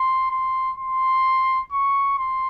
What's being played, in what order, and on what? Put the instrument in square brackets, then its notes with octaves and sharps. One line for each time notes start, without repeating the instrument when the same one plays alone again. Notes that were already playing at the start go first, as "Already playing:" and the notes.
Already playing: [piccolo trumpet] C6
C6
C6
C#6
C6